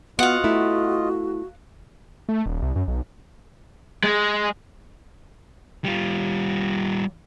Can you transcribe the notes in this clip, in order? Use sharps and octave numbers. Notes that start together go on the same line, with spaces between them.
B3 F4 F#4 D#5 F5 F#5
A3 E4
A3
D#1
C2
F#2
B1
G#3
G3 F4